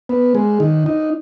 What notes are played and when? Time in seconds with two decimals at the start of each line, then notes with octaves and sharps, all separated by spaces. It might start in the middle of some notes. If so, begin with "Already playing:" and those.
0.09 B3
0.35 G#3
0.60 D#3
0.86 D#4